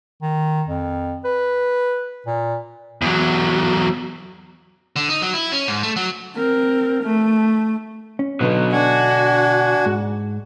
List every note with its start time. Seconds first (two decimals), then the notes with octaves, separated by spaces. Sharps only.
0.22 D#3
0.68 F2
1.25 B4
2.27 A#2
3.02 E2 F#3
4.96 D3
5.09 D#4
5.22 F#3
5.34 E4
5.52 C#4
5.67 G#2
5.83 A3
5.96 F#3
6.36 C4 A#4
7.04 A3
8.19 C#4
8.41 B2 D3 F#3 B3 B4
8.73 D4 F#4 G#5
9.86 G#2